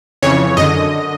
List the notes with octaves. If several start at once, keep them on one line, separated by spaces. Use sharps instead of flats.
F2 C#3 E3 C#5
F#2 D3 D#5